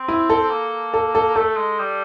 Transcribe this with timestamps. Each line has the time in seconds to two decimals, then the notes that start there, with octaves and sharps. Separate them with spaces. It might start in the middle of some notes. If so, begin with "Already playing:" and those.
Already playing: C4
0.08 E4
0.30 A4
0.50 A#3
0.94 A4
1.15 A4
1.35 A3 A4
1.57 G#3
1.79 G3